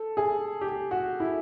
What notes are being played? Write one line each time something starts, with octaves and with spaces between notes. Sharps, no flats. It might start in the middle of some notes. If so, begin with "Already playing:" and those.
Already playing: A4
G#4
G4
F#4
E4